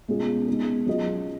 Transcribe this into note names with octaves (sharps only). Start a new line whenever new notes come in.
B2 G#3 C#4 F4 G#4
B2 G#3 D#4 G#4
F#3 C#4 F4 G#4 D#5